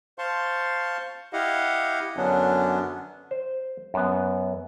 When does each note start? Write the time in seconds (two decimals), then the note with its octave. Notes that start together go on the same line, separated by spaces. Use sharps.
0.18 C5 F5 A5 C6 C#6
1.33 E4 G4 D#5 F5 F#5
2.17 F#2 D3 F#3 B3 C#4 D4
3.31 C5
3.94 F#2 B3